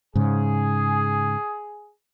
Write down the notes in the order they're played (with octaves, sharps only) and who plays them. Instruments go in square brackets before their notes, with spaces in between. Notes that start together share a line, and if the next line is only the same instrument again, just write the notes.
[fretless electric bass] G#2 C#3 [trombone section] G#4